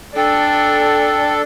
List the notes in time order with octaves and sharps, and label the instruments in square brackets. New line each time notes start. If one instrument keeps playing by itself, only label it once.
[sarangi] D4 [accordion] A4 [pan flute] G5